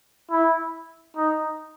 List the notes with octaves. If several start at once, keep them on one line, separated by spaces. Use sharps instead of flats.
E4
D#4